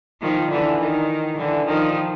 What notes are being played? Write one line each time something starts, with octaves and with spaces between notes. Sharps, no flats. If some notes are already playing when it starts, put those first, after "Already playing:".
D#3 F3
D3 E3
D#3
D3 E3
D#3 F3